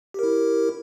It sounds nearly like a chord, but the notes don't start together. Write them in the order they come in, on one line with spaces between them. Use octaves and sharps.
G4 A#4 E4